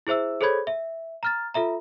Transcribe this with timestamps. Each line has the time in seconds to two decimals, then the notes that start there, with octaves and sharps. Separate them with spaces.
0.07 E4 G#4 C5 E5 E6
0.41 G#4 A4 C5 C#5 B5 G#6
0.67 E5
1.23 A#5 F6 A6
1.54 F4 A4 E5 A#5